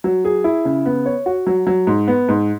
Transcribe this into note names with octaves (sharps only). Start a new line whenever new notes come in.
F#3
G#4
E4
C#3
B3
C#5
F#4
F#3
F#3
G#2
B3
G#2